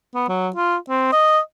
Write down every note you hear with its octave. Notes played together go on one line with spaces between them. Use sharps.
B3
F#3
F4
C4
D#5